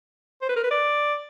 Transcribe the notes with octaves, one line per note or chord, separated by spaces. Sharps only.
C5
B4
A#4
B4
D5